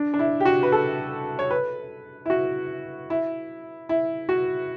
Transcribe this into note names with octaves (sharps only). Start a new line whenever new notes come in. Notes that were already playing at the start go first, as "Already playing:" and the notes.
Already playing: D4
D4
E4
G4
F#4
B4
A4
C#5
B4
E4
F#4
E4
E4
F#4